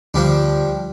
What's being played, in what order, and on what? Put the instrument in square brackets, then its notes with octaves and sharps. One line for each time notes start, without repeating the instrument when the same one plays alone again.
[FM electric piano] D2 [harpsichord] F3 G3 D4